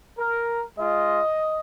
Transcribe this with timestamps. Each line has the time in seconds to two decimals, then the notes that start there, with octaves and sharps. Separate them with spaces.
0.19 A#4
0.79 G#3 F4 D#5